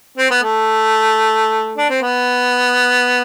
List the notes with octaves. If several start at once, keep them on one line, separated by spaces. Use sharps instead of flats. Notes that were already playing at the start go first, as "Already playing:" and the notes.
C4
B3
A3
D4
C4
B3